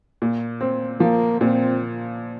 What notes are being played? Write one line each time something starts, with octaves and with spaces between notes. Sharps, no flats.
A#2
C4
F3 A#3
A#2 C4